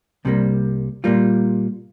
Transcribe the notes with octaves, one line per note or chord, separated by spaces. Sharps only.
C2 C3 G3 A#3
A#2 G3 A#3 F4